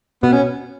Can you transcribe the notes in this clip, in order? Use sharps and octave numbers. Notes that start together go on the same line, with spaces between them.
B2 B3
C#4